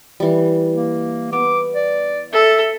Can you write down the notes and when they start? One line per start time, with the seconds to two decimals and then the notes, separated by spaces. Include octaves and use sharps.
0.20 E3 G3
0.73 A#3
1.33 B3 D6
1.75 D5
2.33 A4 E5